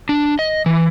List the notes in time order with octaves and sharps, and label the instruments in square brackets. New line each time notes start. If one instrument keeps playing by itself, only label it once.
[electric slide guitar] D4
D#5
E3